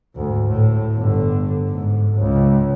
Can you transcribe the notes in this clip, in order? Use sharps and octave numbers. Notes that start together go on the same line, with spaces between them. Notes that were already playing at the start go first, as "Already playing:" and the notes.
D2 G#2
A2
G1 D3
G#2
C#2